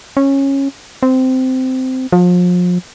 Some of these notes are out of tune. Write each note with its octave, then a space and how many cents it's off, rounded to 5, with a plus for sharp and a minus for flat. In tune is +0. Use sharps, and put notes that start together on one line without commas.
C#4 -15
C4 -15
F3 +35